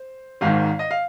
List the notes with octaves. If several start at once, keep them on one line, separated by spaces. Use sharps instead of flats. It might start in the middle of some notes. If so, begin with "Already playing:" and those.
Already playing: C5
G#1 G#2 D#3 F5
D#5
F5